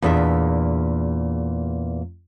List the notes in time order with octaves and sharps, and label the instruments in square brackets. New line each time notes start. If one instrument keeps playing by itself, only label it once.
[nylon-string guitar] E2 A#2 G#3 D4 E5